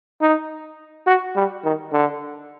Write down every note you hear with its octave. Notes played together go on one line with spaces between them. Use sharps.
D#4
F#4
G3
D#3
D3